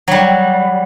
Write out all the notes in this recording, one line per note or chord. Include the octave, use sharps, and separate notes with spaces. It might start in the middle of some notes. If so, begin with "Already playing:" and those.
F#3 G3